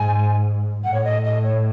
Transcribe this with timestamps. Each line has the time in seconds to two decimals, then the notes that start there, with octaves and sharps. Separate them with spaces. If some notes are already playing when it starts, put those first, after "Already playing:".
Already playing: G#2 G#5
0.84 A2 F#5
0.94 C#5
1.04 D#5
1.24 D#5
1.44 C#5